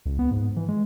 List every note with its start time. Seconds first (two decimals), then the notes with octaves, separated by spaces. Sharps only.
0.06 C#2
0.19 B3
0.31 G#2
0.56 E3
0.68 G#3